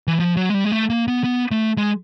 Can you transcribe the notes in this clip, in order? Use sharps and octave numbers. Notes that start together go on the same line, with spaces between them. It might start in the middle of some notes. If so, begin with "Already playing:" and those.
E3
F3
F#3
G#3
G3
G#3
A3
A#3
B3
B3
A3
G#3